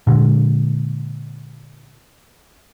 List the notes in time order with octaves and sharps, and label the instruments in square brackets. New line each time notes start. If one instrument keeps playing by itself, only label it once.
[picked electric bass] A#2 D3 G#3